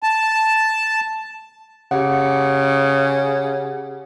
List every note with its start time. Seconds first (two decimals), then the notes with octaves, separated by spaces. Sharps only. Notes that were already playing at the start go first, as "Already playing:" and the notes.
0.03 A5
1.91 C#3 G4 F#5